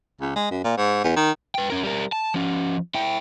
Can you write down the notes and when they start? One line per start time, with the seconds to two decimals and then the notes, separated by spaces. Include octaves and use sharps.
0.21 C#2
0.36 G#3
0.51 F#2
0.64 A#2
0.77 G#2
1.04 E2
1.16 D#3
1.55 B4 G5
1.70 C#4 A#4
1.83 G3 A#4
2.12 A5
2.34 F3 C#4
2.95 E4 G5